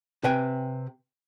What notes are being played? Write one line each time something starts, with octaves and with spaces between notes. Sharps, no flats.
C3 B4 G5 G#5